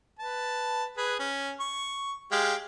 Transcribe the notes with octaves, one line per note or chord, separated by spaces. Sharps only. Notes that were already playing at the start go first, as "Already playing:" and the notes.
B4 A5
G#4 B4
C#4
C#6
G#3 G4 F5